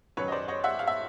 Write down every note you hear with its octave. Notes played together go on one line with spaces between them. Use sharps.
F#2 D#3 F#3 B4 C#5
D#5
C5 D5
C#5 D#5
E5 F#5
F5
E5